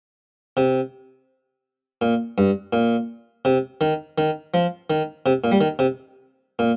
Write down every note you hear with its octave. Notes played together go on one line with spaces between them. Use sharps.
C3
A#2
G2
A#2
C3
D#3
D#3
F3
D#3
C3
A#2
G3
D#3
C3
A#2